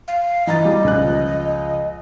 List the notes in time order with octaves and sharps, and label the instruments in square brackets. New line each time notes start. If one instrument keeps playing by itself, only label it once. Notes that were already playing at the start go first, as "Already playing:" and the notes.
[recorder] F5
[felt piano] E3 A#5 A6 [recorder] D#5
[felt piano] G3
C#2 F3 F#6